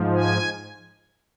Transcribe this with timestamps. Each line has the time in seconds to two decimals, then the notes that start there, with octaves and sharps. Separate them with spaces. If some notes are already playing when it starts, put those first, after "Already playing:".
Already playing: G#2 F3
0.16 G#5